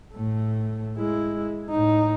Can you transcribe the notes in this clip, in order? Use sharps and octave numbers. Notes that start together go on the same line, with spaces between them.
A2 A3
G#3 E4
A2 D#4